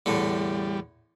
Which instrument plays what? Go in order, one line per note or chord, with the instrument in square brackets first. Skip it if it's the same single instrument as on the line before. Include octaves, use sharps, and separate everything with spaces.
[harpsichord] E2 A2 D3 [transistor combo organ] G3